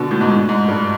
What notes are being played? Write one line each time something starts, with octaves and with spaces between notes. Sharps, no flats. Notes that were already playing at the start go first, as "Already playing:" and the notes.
Already playing: B2 D3
A2
G#2
A2
G#2
G2